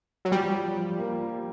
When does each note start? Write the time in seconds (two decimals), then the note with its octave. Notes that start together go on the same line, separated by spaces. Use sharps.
0.25 F#3
0.32 F3 G3
0.54 F3
0.76 F3
0.98 A#3
1.20 F3